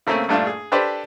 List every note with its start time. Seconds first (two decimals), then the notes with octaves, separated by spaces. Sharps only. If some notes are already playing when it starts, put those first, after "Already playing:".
0.07 C#3 A3 A#3 C4 C#4
0.28 A#1 G2 A3 D4 F4 A5
0.47 G#4
0.72 D4 G4 A4 B4 C5 D5